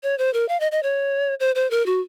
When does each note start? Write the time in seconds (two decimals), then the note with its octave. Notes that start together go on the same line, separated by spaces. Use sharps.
0.03 C#5
0.18 C5
0.34 A#4
0.49 F5
0.60 D#5
0.72 D#5
0.83 C#5
1.40 C5
1.55 C5
1.71 A#4
1.86 F#4